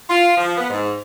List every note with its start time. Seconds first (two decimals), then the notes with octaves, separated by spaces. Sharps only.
0.10 F4
0.38 F3
0.58 B3
0.70 G#2